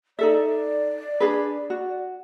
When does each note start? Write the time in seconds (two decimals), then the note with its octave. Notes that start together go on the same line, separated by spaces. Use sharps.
0.19 D#4 A4 D5 E5
1.20 D4 G#4 B4
1.70 F#4